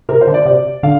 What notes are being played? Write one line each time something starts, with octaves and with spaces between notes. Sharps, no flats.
C3 A#4
C5
D3
D5
C3 D5
D3 F5